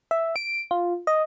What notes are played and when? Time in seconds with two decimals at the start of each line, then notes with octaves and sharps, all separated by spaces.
0.11 E5
0.36 D7
0.71 F4
1.07 D#5